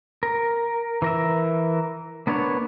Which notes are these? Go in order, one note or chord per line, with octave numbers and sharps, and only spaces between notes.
A#4
E3 A#4 E5
A#3 B3 D4 C#5